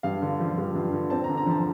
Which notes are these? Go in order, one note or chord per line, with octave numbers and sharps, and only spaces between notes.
G2 F5
D3
F3
G2
G2
D3
C4 A5
A#5
D3
A#5
F3 A5